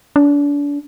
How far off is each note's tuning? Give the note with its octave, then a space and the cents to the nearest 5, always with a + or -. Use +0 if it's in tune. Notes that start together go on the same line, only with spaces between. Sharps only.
D4 -35